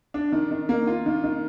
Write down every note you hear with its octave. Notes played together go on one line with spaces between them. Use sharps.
D4
D#3
D#3
A#3
F4
D#3
D#3